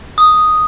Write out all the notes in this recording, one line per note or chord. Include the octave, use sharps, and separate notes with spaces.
D#6